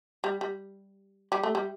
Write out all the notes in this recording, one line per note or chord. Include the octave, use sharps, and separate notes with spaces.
G3
G3
G3
A3
G3